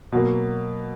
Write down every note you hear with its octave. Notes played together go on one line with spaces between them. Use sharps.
B2 F#3 A#3